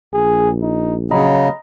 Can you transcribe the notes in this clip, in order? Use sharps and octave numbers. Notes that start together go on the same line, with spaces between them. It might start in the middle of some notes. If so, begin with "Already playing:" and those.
A#1 G#4
D#4
C#3 F#3 D#5 A#5 B5